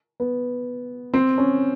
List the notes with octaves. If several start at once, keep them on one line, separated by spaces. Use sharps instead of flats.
B3
C4
C#4